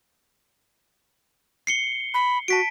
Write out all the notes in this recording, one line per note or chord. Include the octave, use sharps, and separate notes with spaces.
C7 C#7 G7
B5
F#4 A5 B6 D7